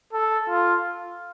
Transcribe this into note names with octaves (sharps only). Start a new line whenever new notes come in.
A4
F4